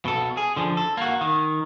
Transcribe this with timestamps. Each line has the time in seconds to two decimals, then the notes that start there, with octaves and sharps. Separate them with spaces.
0.05 B2 A4
0.37 G#4
0.57 D3 F3
0.77 A4
0.97 A#3 F#4
1.21 D#3